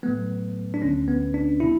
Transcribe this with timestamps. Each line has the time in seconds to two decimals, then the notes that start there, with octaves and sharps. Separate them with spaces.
0.03 A2 F#3 A3 B3
0.74 D4
0.82 D2 D3 A3 C#4
1.08 B3
1.34 D4
1.60 B2 F#3 E4